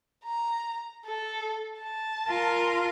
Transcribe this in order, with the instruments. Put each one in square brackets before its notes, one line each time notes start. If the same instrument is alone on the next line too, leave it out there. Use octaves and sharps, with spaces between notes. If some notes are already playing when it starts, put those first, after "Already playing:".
[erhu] A#5
A4
A5
[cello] F4 A#4